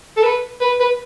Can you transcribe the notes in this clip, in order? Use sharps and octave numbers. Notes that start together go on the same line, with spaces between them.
A4
B4
B4
B4